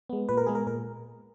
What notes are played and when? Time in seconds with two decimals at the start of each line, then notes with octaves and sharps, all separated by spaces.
0.09 G#3 B3
0.29 A#2 B4
0.37 A#4
0.46 G#3 B3 G#4
0.55 A#4
0.67 A#2 A#4